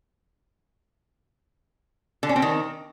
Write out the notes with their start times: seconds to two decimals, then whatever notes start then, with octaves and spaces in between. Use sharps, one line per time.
2.23 D3
2.29 C#4
2.36 C4
2.42 D#3